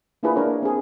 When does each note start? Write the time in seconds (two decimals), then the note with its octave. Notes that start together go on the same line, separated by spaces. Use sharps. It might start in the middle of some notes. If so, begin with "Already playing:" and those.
0.23 A#3 D4 E4 F4 G#4 B4
0.36 A#3 D4 A#4 C#5
0.62 C4 G#4